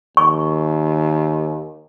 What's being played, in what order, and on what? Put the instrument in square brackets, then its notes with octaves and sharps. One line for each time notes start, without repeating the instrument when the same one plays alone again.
[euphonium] D#2 [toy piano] C#6